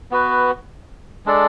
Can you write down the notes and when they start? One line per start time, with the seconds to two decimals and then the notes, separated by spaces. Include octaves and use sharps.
0.11 B3 F#4 B4
1.26 G#3 D4 A4 D5